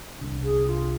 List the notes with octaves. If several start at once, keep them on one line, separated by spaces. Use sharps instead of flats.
C2 D3
G#4
F4